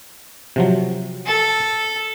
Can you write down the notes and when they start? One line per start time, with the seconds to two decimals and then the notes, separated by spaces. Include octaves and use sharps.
0.56 C3 F3 F#3
1.26 A4